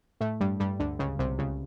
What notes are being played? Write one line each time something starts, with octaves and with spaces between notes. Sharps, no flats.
A2 A3
G2 G3
G2 G3
D2 D3
C#2 C#3
C2 C3
C#2 C#3